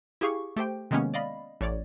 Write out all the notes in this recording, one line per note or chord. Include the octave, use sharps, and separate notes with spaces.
E4 G4 G#4 F5 C#6
A3 G4 C5 G5
C3 D#3 G#3 A#3 B3 C#4
D5 D#5 F5 B5
A1 C#5 D5